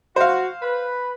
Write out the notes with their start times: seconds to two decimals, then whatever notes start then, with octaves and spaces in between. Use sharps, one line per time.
0.16 F#4 C5 F5
0.62 B4